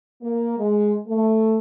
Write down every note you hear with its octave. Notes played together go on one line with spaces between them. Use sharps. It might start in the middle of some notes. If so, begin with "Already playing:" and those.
A#3
G#3
A3